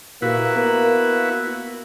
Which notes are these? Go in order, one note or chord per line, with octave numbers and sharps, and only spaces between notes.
A#2 A#3 E4 F#4 G4 B4
B3 A#4